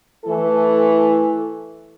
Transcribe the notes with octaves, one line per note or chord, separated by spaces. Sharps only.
E3 A3 E4 A4